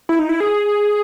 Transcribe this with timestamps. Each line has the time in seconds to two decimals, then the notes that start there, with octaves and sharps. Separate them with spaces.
0.09 E4
0.19 D#4
0.29 E4
0.40 G#4